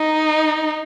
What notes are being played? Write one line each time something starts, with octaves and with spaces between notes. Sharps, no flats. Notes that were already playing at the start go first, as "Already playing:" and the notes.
Already playing: D#4